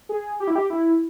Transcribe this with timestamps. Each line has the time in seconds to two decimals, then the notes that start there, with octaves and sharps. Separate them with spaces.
0.09 G#4
0.40 G4
0.48 E4
0.55 G4
0.70 E4